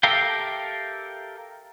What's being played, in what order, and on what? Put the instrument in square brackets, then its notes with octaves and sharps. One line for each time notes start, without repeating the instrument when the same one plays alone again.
[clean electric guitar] G4 A4 A#4 E5 F5 G5